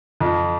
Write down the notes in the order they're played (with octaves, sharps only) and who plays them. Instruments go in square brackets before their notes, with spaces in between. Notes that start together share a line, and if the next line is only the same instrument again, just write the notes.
[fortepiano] F2